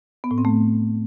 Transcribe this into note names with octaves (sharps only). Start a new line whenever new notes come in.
B3
A2
C4
A3